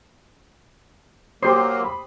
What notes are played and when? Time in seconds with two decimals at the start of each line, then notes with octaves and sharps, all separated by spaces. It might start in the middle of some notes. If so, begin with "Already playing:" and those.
1.43 F#3 A#3 G4 C5 C6 D#6 C7
1.84 B5